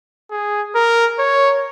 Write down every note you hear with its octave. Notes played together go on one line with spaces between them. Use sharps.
G#4
A#4
C#5